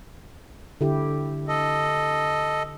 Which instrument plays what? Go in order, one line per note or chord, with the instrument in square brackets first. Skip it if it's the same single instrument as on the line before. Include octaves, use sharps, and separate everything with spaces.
[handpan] D3 E4 G4
[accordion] A4 D#5